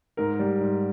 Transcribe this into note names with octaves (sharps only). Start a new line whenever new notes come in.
G#2 A#4
G3
G#2